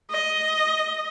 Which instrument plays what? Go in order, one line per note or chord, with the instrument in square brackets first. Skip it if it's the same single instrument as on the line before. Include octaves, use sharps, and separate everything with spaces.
[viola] D#5